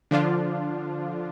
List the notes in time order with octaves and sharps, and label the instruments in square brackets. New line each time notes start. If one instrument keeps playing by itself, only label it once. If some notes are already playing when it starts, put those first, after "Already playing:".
[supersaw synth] D3 F3 D4 F4